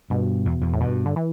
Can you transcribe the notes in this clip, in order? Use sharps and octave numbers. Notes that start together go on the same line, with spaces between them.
G2 B2
E2
E2
A2
G2 B2
D3
E3